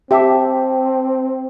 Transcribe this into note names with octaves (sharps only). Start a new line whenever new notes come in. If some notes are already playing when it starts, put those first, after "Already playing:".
C4 G4 E5 G5 A5 D6